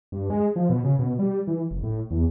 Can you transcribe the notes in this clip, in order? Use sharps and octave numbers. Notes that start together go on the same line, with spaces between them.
G2
G#3
F3
B2
C#3
B2
G3
E3
F#1
A2
E2